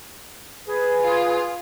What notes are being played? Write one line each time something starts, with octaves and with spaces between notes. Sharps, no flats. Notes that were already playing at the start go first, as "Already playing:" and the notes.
G#4 B4
F4